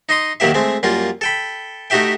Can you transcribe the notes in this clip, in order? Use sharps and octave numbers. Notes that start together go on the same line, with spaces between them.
D#4 D#5 C6 D#6
D#2 D#3 F#3 A#3 G4 E5
G#3 A3 C4
F#2 G3 A#3 F4
A4 G5 B5
A3 D#4 F#4 G4 E5 G5